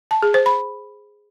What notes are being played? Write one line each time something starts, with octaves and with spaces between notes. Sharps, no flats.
A5
G#4
C5
B5